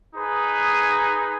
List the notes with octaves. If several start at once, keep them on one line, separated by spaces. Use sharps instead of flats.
D#4 G#4 B4